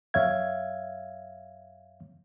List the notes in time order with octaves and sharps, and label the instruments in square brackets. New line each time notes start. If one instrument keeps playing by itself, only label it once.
[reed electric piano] F#2 C#5 E5 F5 G#6